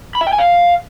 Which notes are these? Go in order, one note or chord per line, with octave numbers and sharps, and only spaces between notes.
B5
E5
G5
G#5
F5